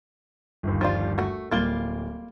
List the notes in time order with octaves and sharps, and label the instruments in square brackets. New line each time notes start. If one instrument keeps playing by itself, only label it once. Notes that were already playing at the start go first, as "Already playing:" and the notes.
[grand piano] G1 D#2
[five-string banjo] F3 G3 F4
A3 F#4
[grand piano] D1 G7 [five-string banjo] G3 A#3 F4